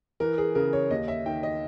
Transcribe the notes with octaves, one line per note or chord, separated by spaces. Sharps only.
E3 A#4
G#4
C#3 A#4
C#5
D#2 D#5
E5
D#3 G5
D#5